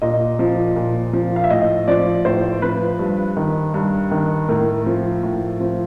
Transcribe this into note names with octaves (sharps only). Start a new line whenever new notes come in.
A#2 D#5
F3
A#2
F3
F5
E5
A2 D#5
F3 D5
A2 C5
F3 B4
G2
D#3
G2
D#3
A2 A#4
F3
A2
F3